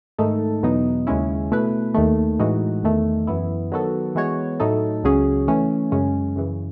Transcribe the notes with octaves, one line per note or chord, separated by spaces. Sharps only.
G#2 D#3 A3 D#4 A4
E2 B2 F#3 B3 D#4
D#2 C#3 G#3 C#4 E4
B2 A3 E4 B4
D#2 D#3 A3
A2 E3 G#3 D#4 F#4
E2 D#3 A3
F#2 E3 B3 E4
D#3 F#3 B3 F#4 A4
E3 G#3 B3 F#4 C#5
A2 F#3 A3 D#4 A4
C#2 C#3 F#3 C#4 G#4
E3 A3 C#4
F#2 C#3 G#3 C#4
F#2 C#3 E3